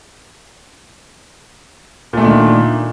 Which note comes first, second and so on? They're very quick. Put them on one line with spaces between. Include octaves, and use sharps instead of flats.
A#2 A3 D4 D#3